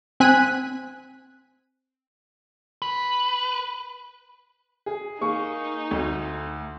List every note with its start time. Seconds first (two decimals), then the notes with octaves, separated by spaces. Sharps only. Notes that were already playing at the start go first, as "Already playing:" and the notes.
0.20 C4 G#5 F#6 B6 D#7
2.82 B4
4.86 G#4
5.21 A#3 D#4 G#4 C#6
5.91 D2